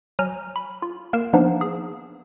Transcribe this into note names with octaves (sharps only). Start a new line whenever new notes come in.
F#3 G#5 A#5 F6
B5
F4
A#3 A#4 C7 E7
E3 F3 A#3 B3 D4 D#4
G#4